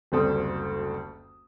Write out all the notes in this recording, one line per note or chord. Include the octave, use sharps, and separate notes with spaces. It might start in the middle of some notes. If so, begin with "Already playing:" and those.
F#1 D2 G3 C4 A4 D#6